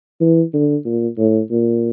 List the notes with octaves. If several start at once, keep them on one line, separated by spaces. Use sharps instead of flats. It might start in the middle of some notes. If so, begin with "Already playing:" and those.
E3
D3
A#2
A2
A#2